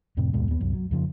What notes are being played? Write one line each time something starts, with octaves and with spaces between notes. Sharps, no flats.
F2 A2 C3
D#2 G#2 B2 G#3
D#2 B3
C2 F#2
F#3
F2 C#3 F3